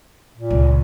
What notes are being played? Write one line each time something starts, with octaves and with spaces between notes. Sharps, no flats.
A#2
C#2